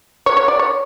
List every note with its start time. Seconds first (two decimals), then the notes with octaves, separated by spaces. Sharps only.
0.26 C#5
0.37 C#5
0.48 D5
0.59 C#5